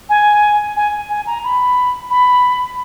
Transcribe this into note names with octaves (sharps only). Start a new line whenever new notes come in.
G#5
G#5
G#5
A#5
B5
B5